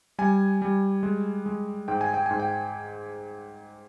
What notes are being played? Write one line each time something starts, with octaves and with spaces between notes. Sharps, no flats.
G3 G#5
G3
G#3
G#3
G#2 G5
G#5
G5
G#2 G#5
G5